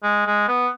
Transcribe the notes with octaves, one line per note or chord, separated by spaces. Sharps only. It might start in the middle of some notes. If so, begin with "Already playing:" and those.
G#3
G#3
B3